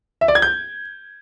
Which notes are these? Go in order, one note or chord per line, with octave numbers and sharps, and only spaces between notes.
E5
D5
G#6
G6